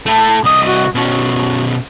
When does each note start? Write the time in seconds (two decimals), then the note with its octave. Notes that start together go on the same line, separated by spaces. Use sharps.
0.06 A3 E4 A5
0.44 C2 D#5 D#6
0.65 F#4
0.95 B2 C#4 F#4